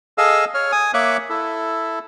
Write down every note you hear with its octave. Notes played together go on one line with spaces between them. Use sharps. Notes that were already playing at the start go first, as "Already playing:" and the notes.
G#4 A4 D#5 F5 E6
C#5 F6
G#5 D#6
A#3 C#5 E5 C#6 D6 F#6
E4 A4